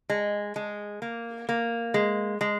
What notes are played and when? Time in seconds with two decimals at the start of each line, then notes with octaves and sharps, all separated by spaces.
0.10 G#3
0.56 G#3
1.02 A#3
1.49 A#3
1.94 G#3
2.41 G#3